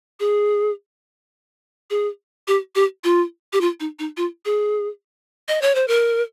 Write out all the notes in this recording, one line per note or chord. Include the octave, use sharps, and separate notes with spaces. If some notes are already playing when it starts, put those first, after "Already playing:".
G#4
G#4
G4
G4
F4
G4
F4
D#4
D#4
F4
G#4
D#5
C#5
C5
A#4